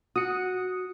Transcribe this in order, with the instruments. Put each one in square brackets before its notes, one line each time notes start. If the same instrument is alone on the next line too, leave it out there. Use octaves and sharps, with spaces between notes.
[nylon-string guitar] F#4 [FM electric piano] D#6 C#7